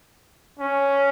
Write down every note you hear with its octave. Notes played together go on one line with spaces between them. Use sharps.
C#4